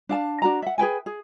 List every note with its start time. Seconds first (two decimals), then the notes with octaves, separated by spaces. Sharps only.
0.09 D4 F5 A5
0.42 D4 F#4 A#5
0.62 E5 F#5
0.78 G#4 B4 G5 G#5
1.06 G#4